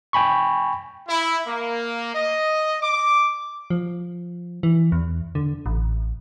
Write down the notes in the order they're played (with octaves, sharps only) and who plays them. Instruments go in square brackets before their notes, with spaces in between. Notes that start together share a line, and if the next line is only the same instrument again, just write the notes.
[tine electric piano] G5 G#5 B5 C#6
[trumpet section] E4
A#3
D#5
D6
[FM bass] F3
E3
E2
D3
A1